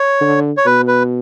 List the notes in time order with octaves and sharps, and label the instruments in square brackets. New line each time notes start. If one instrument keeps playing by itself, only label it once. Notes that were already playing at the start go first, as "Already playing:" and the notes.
Already playing: [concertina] C#5
[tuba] D3
[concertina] C#5
[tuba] B2 [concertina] B4
[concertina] B4